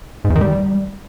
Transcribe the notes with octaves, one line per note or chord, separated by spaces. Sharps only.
G#2
E2
D#3
G3